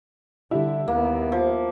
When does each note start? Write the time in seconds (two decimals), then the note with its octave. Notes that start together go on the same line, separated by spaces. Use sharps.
0.51 D3 G3 E4
0.88 D#2 A#3 B3
1.32 F3